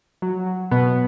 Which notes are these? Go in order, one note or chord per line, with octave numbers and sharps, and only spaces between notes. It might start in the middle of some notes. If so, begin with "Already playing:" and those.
F#3
F#3
B2 B3